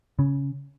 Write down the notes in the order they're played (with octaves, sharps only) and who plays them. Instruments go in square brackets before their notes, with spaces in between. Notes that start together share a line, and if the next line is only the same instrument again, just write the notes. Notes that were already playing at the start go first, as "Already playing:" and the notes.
[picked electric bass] C#3 C#4